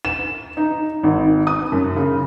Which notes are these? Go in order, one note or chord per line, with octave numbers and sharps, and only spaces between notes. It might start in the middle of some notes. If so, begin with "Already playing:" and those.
E7
D#4
G#1
D#6
F#2
C#3